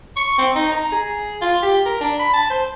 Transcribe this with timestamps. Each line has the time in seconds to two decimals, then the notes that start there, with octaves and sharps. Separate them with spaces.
0.16 C#6
0.38 C4
0.55 D#4
0.72 A#5
0.92 G#4
1.42 F4
1.63 G4
1.86 A#4
2.01 D4
2.20 B5
2.34 A5
2.50 C5